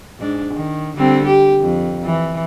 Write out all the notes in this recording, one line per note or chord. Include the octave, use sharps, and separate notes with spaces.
G#2 D4
D#3
D3 G3 C4
G4
F2
E3